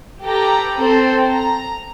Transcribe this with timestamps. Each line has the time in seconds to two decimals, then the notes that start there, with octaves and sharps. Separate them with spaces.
0.24 G4 A4 B4 G5 A#5
0.79 C4 A4
1.32 A#5